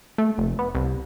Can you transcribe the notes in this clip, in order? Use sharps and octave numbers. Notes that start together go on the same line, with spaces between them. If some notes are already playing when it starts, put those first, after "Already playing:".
A3
F1
B3
C2